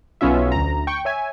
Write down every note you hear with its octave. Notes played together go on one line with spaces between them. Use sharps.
B1 B3 C#4 F4 E5
D2 A#5
G5 C#6
C#5 E5 G#5